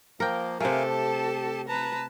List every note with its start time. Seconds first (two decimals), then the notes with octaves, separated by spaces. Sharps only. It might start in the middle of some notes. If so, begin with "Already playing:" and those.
0.20 F3 A#3 A#4 G5
0.60 C3 A3 G4 A4 A#4 F5 G#5
0.90 A5
1.69 B4 A5 A#5